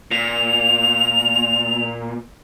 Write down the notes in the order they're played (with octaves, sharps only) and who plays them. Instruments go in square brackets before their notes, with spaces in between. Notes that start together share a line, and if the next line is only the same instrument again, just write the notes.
[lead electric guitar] A#2 [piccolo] F7